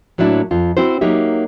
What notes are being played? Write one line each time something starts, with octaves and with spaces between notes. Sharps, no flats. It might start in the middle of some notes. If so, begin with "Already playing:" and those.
A2 F#3 A#3 D4 E4
F2 F4
C4 E4 F#4 C5
F#3 A#3 D#4 G4 E5